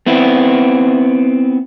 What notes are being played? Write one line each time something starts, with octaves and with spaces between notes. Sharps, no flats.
B3 C4 E4